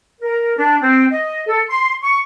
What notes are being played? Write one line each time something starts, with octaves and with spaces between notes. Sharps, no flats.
A#4
D4
C4
D#5
A4
C6
C#6